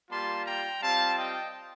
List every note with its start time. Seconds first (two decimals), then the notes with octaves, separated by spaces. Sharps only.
0.10 G3 A#3 F4 A5 C6
0.46 G5 A#5
0.81 G3 C4 F4 F5 A5
1.17 D#5 G5